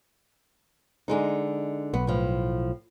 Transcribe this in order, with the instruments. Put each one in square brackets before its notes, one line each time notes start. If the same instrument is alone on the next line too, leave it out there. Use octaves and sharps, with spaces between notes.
[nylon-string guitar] D3 G#3 D#4
[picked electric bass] B1 [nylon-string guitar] B3
[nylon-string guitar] A2 F3